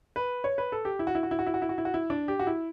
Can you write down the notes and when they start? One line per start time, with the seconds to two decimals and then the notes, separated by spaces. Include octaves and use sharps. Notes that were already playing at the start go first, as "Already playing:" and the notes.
0.16 B4
0.44 C#5
0.58 B4
0.72 A4
0.85 G4
0.99 E4
1.07 F#4
1.15 E4
1.23 F#4
1.31 E4
1.39 F#4
1.47 E4
1.54 F#4
1.62 E4
1.69 F#4
1.78 E4
1.85 F#4
1.94 E4
2.10 D4
2.28 G4
2.39 F#4
2.47 E4